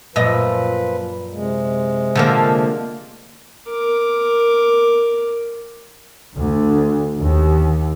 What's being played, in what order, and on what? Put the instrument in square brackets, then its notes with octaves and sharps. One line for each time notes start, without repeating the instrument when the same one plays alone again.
[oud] F#2 A#2 D#5 [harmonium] F3 B4
[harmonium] C3 G#3
[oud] D3 F3 A#3
[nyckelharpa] A#4 D6
[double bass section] D2
D#2